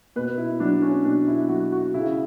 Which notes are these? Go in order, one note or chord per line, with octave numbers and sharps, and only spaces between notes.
B2 B4
E4
F#3 D4
C#4
B2 D4
E4
F#3 F#4
F#4
C#3 E4